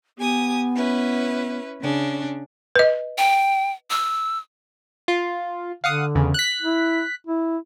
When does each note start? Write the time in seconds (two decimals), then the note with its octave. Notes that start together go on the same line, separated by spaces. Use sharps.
0.18 B3 G4 G#5 D#6
0.75 C#4 E4 B4
1.81 C#3 C#4 D4
2.76 B4 D#5
3.18 G5
3.90 E6
5.08 F4
5.84 D3 F5 F#5 D#6
6.15 E2 C#3
6.34 F#6 B6
6.62 E4
7.27 E4